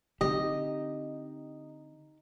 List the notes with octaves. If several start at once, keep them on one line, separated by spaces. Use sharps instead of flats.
D3 C4 D#4 G4 D#5